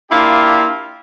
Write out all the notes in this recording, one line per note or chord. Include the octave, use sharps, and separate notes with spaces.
A#3 D4 E4 F4 G4